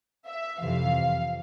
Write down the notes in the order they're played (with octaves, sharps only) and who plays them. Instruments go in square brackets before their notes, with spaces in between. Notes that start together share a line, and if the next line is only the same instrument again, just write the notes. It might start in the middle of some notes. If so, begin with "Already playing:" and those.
[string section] E5
F2 C3 E3 F5